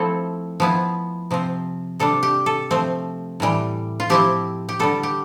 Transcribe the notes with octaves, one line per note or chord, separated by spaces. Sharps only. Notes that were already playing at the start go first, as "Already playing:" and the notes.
Already playing: F3 A3 C4 E4 A4
F3 B3 E4
C3 F3 C4
C3 G3 D4 A4
G4
A4
F3 A3 C4
A2 E3 G3
F4
F3 C4 E4 G4
G4
D3 G3 B3 A4
G4